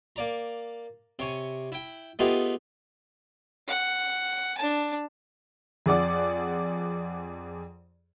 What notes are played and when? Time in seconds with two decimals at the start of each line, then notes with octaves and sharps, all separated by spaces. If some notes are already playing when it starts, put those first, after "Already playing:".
0.16 A#3 D5 A#5
1.19 C3 C#5 G#5
1.72 E4 G5
2.19 A3 B3 D#4 F4 G4 G#4
3.68 F#5
4.57 D4 A5
5.86 F2 G#4 D5 F#5 D6